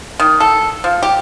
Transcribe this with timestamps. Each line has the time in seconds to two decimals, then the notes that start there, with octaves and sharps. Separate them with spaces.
0.20 D#3
0.40 A4
0.84 F3
1.03 G4